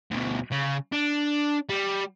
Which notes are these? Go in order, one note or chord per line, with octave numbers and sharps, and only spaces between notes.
D2 B2
C#3
D4
G3